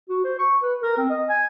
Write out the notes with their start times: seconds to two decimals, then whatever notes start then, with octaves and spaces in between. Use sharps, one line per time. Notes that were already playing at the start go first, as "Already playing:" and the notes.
0.09 F#4
0.24 C5
0.39 C#6
0.63 B4
0.83 A#4
0.97 C4
1.10 D#5
1.29 G#5